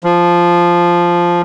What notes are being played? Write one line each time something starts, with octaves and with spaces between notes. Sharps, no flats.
F3